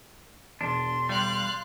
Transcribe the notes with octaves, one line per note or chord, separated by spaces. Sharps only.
E1 D4 C6 C7
G3 F5 F#6